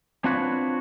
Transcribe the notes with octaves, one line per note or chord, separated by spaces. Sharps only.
C4 D4 F4 F#4 B4 C#5